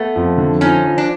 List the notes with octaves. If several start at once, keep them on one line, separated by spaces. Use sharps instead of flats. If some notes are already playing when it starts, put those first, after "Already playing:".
Already playing: A3 B3
F2
D3
F3 C#4 D#4
F3
D4